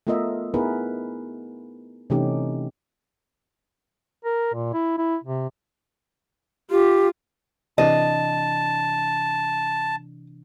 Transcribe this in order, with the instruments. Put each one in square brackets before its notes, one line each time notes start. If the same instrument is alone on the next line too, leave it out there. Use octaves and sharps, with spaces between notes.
[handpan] A3 B3 F4 A#4 D#5 E5
B3 D#4 E4 G#4 A#4 B4
C3 E3 A3 C#4 D#4 G4
[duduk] A#4
A#2
E4
E4
C3
[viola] F4 [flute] G4
[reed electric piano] C3 E3 D4 [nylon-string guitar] D#5 [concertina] A5